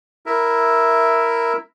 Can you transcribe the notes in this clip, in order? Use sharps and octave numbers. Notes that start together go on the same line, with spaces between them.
E4 A#4 E5